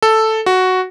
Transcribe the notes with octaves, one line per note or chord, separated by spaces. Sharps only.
A4
F#4